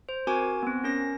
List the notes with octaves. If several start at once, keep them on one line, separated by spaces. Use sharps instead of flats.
C5
C4 F#4 A#4 G#5 D6 G#6
B3 C4
C#4 A#4 A#6